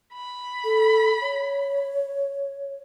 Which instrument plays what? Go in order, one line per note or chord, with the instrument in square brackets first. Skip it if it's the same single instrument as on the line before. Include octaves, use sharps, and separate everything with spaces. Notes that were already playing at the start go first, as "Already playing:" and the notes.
[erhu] B5
[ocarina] A4
C#5